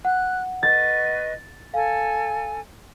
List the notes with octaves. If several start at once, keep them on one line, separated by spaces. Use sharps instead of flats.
F#5 F#6
B4 D#5 C#6 A6
A4 F5 G#5